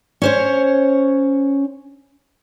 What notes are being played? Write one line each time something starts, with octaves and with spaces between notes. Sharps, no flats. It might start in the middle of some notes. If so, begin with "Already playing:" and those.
C#4 C5 C#5